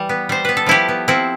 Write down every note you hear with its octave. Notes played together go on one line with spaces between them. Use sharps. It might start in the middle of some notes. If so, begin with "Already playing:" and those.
Already playing: E3 G3
B3
G3 C5
B3 B4
A4
F3 E4 G4
B3
F3 C4 E4